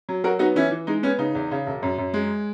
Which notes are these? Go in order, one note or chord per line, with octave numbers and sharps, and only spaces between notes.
F#3
F#3 F#4 A#4
B3 D#4 F#4
E3 C#4 E4
E3
G#3 D#4
B3 C#4
C#3 D#4
E2
C#3
E1
F#2
F#2
G#3